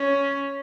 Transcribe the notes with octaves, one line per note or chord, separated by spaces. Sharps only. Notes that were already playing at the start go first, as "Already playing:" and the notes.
Already playing: C#4